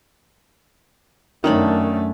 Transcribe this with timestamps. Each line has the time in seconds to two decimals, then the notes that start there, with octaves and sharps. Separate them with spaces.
1.44 F#2 D#3 A3 C#4 D4 B5